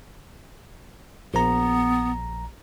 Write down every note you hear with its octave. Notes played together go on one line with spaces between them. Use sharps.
A#1 B3 A#5